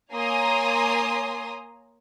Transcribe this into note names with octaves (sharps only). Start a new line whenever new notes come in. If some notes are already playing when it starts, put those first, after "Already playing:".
A#3 C#5 G#5 A#5 C6 D#6